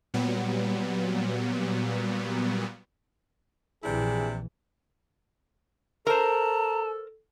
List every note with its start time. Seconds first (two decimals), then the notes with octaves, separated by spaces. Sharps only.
0.14 A#2 F#3 G3 B3
3.84 A#1 C3 E3 D4 E4 G#4
6.07 A4 A#4 C5 A5 A#5